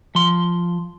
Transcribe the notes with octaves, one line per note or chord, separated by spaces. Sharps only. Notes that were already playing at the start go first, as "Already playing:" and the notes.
F3 C6